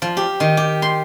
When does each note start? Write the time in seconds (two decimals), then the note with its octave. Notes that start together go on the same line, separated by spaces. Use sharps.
0.02 F3
0.17 G4
0.40 D#3
0.57 G4
0.82 C6